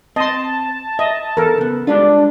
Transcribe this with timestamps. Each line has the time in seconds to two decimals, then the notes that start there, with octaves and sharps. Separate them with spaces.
0.16 C4 D#5 A5 C6
0.99 D#5 E5
1.37 E2 A4 A#4
1.58 C#3 B3
1.87 G3 G#3 D4 F4